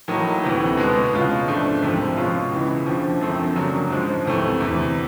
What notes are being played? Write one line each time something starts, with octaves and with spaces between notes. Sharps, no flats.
A2 F#3 A#3 D#4
D2 C3 E3
B2 G#3 B3
C#2 B2 G#3 C#4 F4
G#2 F3 A3 D4
C2 C3 F3 G#3
B2 G#3 C#4 F4
C#2 C#3 E3
D#2 D3 F3
F#2 D3 F3 A3 C4
C#3 F#3 A#3 D4
G#2 F3 G#3
D2 C3 E3 A3
E2 C3 E3